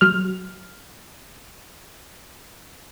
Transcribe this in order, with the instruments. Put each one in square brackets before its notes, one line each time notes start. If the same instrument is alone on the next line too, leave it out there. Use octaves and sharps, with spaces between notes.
[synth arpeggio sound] F#3 F6